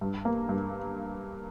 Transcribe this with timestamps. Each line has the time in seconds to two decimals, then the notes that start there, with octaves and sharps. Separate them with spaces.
0.01 G2
0.25 A#3
0.49 G2